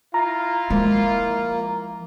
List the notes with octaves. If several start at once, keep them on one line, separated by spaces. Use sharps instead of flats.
E4 F4 A#5
F3 G#3 A#3